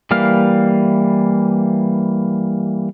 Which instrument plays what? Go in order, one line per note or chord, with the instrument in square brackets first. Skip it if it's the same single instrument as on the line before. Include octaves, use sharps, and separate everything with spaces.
[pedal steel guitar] E3 G3 A#3 F5 F6